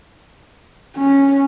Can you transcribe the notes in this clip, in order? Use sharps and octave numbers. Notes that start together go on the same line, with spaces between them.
C#4